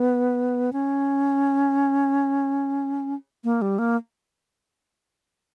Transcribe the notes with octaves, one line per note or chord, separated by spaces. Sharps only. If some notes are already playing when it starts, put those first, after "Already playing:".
Already playing: B3
C#4
A#3
G3
A#3